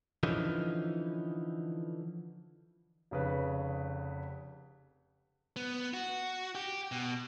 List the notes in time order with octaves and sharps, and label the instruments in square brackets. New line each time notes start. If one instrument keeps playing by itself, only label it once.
[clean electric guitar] D3 E3 F3 C#4 D#4
[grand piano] F1 C#3 B4
[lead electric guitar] B3
F#4
G4
B2